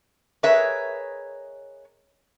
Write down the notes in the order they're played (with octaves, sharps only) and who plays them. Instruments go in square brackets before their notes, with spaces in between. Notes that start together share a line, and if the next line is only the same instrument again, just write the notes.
[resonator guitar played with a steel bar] G#4 A#4 B4 C#5 D#5 E5